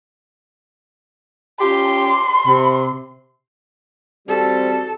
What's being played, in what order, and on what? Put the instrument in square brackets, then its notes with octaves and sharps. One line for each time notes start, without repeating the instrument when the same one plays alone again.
[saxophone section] C#4 F4 G4 [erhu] C6
[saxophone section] C3
[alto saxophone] G3 [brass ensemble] C4 [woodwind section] F#4 [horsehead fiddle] A4